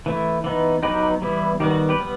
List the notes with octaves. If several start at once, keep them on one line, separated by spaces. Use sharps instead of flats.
E3 A3 E4
E3 B3 D#4
F#3 B3 D#4 G4 B4
E3 G3 B3 E4
D#3 G3 B3 G4
F#4
G4 B4
G3 B3